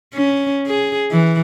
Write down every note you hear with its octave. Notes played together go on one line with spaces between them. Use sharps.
C#4
G#4
E3